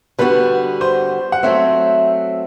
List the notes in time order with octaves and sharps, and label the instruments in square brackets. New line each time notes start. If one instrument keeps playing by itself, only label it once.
[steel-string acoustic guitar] D3 G3 B3 F#4 [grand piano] B4
[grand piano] C5
F#5
[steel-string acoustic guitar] F#3 A3 C4 [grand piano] E5